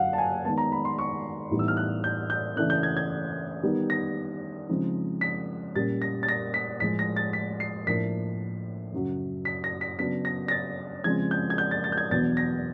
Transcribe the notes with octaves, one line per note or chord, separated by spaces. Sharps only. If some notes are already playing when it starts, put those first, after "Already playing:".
Already playing: F#2 D3 F#3 F5 F#5
A5
G#5
D#3 G#3 B3 A5
A#5
B5
C6
C#6
A2 E3 G3 B3 D#4
E6
F6
F#6
G6
G6
C#3 E3 A3 D4 F#6
G6
G#6
G#6
D#3 G3 B3 D#4
A#6
C#3 F3 G#3 C4 D#4
B6
A#2 G3 A#3 C#4 A6
A#6
A6
A#6
B6
A2 F3 G#3 B6
A#6
A6
B6
C7
A2 F3 A#3 D4 B6
F#2 C#3 F#3
B6
A#6
B6
C#3 F#3 B3 D4 B6
A#6
A#6
A6
C#3 F3 G#3 C4 G#6
G6
G#6
G6
A6
A6
G6
G#6
E2 B2 F#3 B3 D4 A6
A#6